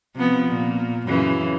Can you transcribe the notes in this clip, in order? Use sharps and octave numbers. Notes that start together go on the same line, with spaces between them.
C3 F3 B3
A#2
F#2 C#3 E3